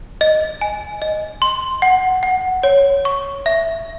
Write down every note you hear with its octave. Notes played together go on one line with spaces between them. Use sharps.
D#5
G#5
D#5
C6
F#5
F#5
C#5
C#6
E5